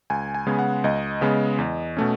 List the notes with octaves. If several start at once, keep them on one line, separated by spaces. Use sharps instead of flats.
C#2 G#5
G#5
C#3 G#3 B3
F#5
C#2 D#5
C#3 G#3 B3
E2
B2 A3 C#4